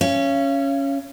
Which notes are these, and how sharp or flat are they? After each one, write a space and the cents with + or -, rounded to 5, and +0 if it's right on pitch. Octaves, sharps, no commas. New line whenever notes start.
C#4 +0 F5 -35